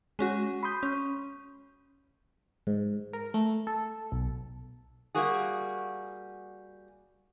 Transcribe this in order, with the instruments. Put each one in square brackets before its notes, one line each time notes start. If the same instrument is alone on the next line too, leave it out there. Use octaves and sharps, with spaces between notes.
[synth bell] G#3 C#4 F#4
B5 C6 D#6 G6
C#4
[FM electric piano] G#2
A#4
A3
A4
B1
[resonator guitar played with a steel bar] G3 A#3 F#4 G#4